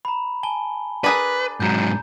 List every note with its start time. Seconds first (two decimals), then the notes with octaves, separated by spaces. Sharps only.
0.05 A#5 B5
0.43 G#5 A5 G7
1.04 D4 G#4 A#4 B4
1.60 G#2 F#3 A#5 G6